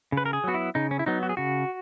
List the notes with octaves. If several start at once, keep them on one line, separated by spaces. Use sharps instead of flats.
C#3
B4
A#4
G#4
F#3 B3 F#4
E4
C#3 D#4
C#4
E4
F#3 B3 D#4
F#4
G#4
C#3 F#4